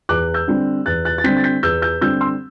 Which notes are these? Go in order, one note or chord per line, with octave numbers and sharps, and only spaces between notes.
E2 D6 F#6
E6 G6
D3 G3 C4
E2 F#6 A6
F#6 A6
A6
D3 G3 C4 G6 B6
A6
G6 B6
E2 E6 G6
E6 G6
D3 G3 C4 E6 G6
C6 E6